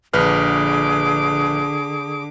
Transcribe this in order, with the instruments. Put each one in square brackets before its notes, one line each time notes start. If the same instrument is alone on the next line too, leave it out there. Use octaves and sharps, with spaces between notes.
[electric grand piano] A#1 B4 F6 [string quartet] D3 D6 [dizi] G#4